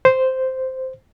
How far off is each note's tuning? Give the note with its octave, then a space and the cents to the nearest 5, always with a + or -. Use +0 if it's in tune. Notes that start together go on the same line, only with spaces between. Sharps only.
C5 -5